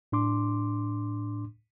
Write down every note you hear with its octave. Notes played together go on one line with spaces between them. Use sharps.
A2 D4 C6 D6